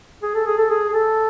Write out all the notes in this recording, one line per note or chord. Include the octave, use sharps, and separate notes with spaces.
G#4
A4
G#4
A4
G#4
G#4
A4